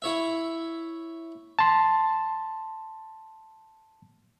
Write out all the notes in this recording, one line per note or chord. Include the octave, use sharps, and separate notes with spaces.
E4 C#5 E5
A5 C6